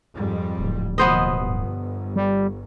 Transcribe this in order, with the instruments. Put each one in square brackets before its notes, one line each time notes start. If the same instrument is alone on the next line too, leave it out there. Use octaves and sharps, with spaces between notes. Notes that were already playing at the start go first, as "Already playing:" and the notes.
[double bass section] F2 G#2 G3
[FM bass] D1
[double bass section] D#2 B2 F3 [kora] B3 C5 D#5
[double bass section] G1
[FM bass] G3